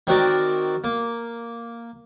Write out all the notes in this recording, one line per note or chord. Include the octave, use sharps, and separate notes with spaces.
D#3 C4 F#4 A#4 D5
A#3